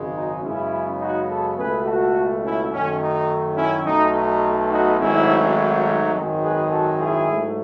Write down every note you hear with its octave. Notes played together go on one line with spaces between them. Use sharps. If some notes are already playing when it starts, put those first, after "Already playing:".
Already playing: G#1 F#2 C#3 G#3
D#4
F#2 C#3 G#3 B3 C#4 E4
D#4 F#4
F#4 A4
C#2 B2 A3 G#4 B4
F#4 A4
C#4 E4
F#2 D#3 F#3 A3 C#4
D#4
C#4 E4
B1 B2 A3 D#4
D#4
D#4 F#4
G#1 G#2 F#3 A3 C#4 E4
D#4
G#1 F#2 D#3 G#3
G#4 B4
F#4 A4
E4 G#4
G#2 F#3 A3